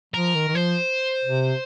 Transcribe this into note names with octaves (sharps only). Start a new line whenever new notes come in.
F3 A#4
D#3
D#3
F3 C5
C3